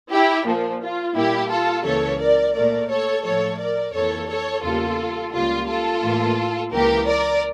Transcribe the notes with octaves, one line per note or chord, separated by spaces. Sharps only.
E4 G4
A#2 F3 A#3
F4
A#2 G3 A#3 E4 G4
F4 A4
C#2 C#3 E3 A#3 A4 C#5
A#4 D5
A#2 A3 A#4 D5
A4 C#5
A2 F3 A3 A4 C#5
A#4 D5
F2 E3 A#3 A4 C#5
A4 C#5
E2 C#3 G3 A#3 F4 A4
C#2 C#3 G3 A#3 F4
F4 A4
A2 E3 A#3
C#2 C#3 E3 A#3 G4 A#4
A#4 D5